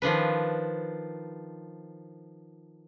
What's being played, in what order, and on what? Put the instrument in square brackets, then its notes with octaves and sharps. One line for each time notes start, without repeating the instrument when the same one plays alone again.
[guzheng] D#3 F3 D4 B4